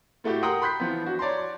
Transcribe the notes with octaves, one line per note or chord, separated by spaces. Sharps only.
A2 A3 F#4 G4
A#4 F#5 G5 A#5 C6 D#6
B5 C6 F#6 G6 B6
E3 F3 B3
D4 F#4
C#5 D5 A5 A#5 C6